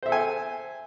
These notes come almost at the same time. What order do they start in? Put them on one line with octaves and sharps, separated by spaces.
C5 E5 A4 G#5